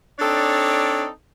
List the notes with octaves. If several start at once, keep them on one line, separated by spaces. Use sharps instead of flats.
C4 D4 D#4 A4 C#5 D5